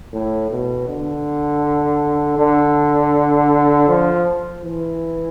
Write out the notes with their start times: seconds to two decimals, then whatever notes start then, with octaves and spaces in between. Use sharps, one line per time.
0.13 A2
0.50 B2
0.88 D3
2.38 D3
3.88 F3
4.64 E3